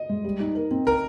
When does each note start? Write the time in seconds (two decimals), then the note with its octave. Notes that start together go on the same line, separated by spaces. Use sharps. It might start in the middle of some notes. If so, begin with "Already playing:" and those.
Already playing: D#5
0.09 G#3
0.24 G3
0.40 D#4
0.55 A#4
0.71 C4
0.87 A#4